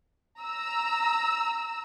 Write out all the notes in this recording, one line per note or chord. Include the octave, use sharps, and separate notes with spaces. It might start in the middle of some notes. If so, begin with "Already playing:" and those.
A#5 E6